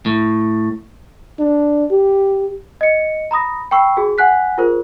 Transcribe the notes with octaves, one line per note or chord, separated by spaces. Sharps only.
A2
D4
G4
D#5 C#7
A#5 B5 D#6 A#6
G5 B5 C#6 E6 C7
F#4 G#4
F#5 G#5 F#6 B6
F4 G#4 A#4 C5